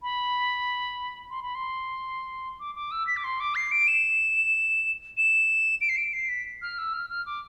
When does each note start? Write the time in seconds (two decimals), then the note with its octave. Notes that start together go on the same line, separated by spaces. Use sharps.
0.02 B5
1.30 C6
1.43 B5
1.55 C6
2.60 D6
2.75 D6
2.91 E6
3.07 B6
3.17 D6
3.24 C6
3.40 D6
3.55 C7
3.71 D7
3.87 E7
5.17 E7
5.81 D7
5.89 C7
5.97 D7
6.13 C7
6.29 B6
6.62 F6
6.78 E6
6.93 F6
7.10 F6
7.26 D6